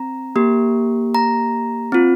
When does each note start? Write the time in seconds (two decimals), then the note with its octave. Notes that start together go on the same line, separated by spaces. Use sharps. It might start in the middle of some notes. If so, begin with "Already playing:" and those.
Already playing: C4 A#5
0.36 A#3 G4
1.15 A#5
1.92 C4 F4